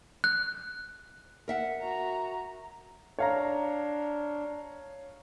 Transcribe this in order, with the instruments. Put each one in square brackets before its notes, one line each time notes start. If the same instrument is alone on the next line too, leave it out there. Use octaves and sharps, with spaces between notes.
[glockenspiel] F#6
[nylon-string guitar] A#4 E5 F#5
[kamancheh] F#4 A#5
[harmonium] D4 [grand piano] C#5 F5 A#5